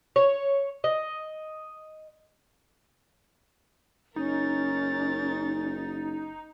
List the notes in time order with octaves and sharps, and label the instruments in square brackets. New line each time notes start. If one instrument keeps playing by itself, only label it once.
[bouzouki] C#5
D#5
[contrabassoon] F#1 [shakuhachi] C#4 [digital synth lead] D#4 [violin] A#4 A6